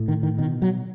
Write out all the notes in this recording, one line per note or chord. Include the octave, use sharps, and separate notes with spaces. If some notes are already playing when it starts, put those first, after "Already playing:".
Already playing: A2
D#3
D#3
B2 D#3
F#3